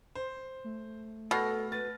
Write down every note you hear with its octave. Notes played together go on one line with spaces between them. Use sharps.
C5
A3
B2 A4 F6 A#6
B4 A6